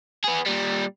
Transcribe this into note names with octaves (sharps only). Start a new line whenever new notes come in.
B3 G#4
A#2 G3